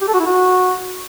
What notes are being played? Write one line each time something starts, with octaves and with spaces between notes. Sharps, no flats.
G4
A4
F#4
E4
F#4